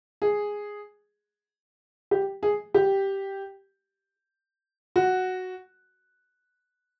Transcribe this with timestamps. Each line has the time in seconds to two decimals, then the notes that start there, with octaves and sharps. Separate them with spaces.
0.22 G#4
2.11 G4
2.43 G#4
2.74 G4
4.96 F#4